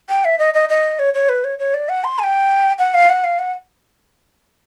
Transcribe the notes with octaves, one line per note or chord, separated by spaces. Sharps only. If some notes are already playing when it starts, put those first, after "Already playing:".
G5
E5
D#5
D#5
D#5
C#5
C#5
B4
C#5
C#5
D5
F#5
C6
G#5
G5
F#5
F5
F#5
F5
F#5